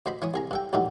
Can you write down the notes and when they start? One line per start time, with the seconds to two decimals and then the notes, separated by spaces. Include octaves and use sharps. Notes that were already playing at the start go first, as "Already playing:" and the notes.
0.06 D2 C5 D#5 B5
0.22 E3 C#5 D#6
0.34 C2 G#4 A#5
0.51 G2 A4 G5
0.73 A#1 D#2 A2 F#3 D#4